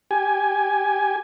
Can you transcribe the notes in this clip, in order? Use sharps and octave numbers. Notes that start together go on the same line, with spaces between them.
G4 G#5